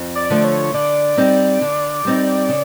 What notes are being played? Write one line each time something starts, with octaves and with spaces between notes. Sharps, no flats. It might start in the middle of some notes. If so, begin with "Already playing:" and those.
Already playing: F2
D5
D3 F3 A3
C#5
D3 D5
G3 C4 D#4
D3
G3 C4 D#4
C#3